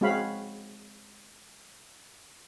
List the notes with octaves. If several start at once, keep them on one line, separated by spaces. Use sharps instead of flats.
G#3 C4 F#4 C#5 F5 B5